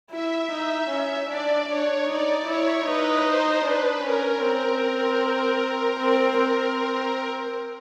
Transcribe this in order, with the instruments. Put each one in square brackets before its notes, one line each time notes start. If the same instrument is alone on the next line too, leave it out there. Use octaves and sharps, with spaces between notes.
[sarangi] E4 [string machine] E5
[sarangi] D#4
C#4
[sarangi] D4 [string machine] D5
[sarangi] D4 [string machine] C#5
[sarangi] D#4 [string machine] D5
[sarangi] E4 [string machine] C#5
[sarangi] D#4 [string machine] B4
[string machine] C5
[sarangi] D4 [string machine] B4
[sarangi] C#4 [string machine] A#4
[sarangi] C4 [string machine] A#4
[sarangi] C4
C4